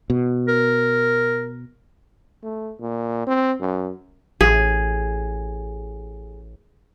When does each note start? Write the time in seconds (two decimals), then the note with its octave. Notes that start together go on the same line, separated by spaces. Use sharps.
0.10 B2
0.48 A#4
2.43 A3
2.80 A#2
3.27 C4
3.60 F#2
4.41 A1 G#4